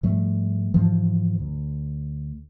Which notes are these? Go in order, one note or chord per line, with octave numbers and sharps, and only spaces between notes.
G#2 F3 G3 A3
G#2 E3 F3
D2